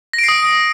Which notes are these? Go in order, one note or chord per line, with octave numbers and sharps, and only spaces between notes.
A#6
D7
C7
D#6